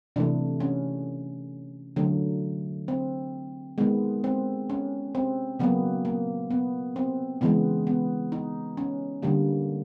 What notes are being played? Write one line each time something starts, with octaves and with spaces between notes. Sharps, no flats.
C3 E3 A3 D4
C#4
D3 F#3 A3
C4
D#3 G#3 B3
C4
C#4
C4
C#3 F#3 A#3 B3
A#3
B3
C4
C#3 E3 G#3 B3
B3
D#4
C#4
D3 G3 A#3